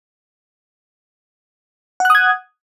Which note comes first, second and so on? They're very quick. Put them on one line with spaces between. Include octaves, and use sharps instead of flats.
F#5 F#6 D#6 G#6